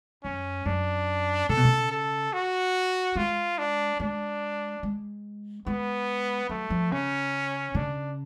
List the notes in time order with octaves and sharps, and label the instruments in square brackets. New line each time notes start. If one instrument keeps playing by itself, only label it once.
[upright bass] F#2 [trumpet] C#4
[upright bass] F#2 [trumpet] D4
[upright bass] C#3 [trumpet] A4
[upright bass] B2
C#3
[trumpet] A4
F#4
[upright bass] G#3 [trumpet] F4
[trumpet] D4
[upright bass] G#3 [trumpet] D4
[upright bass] G#3
[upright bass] G#3 [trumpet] B3
[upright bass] F#3 [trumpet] A3
[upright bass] F3
[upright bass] C#3 [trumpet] C#4
[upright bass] C#3 [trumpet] D4